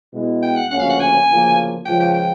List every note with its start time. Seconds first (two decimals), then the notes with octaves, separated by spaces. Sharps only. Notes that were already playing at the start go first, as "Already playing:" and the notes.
0.13 B2 G#3 B3 E4
0.42 G5
0.56 F#5
0.70 D2 C#3 F3 A#3 C#4 F#5
0.80 F5
0.90 F#5
1.00 G#5
1.28 D2 C#3 F3 A#3
1.85 C#2 C#3 F3 G5
2.00 G5
2.14 G5